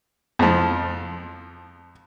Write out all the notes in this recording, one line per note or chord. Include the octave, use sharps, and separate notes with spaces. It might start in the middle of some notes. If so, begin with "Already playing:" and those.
F2 F3